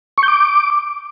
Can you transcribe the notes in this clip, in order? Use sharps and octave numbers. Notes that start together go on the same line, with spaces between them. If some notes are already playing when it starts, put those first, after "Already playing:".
C#6
G6
D6